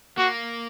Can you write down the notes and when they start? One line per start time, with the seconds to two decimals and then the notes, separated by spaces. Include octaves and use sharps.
0.17 A#3 F#4